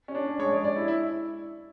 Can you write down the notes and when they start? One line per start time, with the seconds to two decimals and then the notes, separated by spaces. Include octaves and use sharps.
0.08 C#4
0.15 D4
0.39 G#3 C#5
0.51 D5
0.64 D5
0.76 E4
0.88 E4